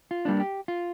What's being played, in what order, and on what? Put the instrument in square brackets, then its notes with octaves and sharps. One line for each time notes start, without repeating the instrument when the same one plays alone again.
[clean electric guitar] F4
G3 A#3 D4
G4
F4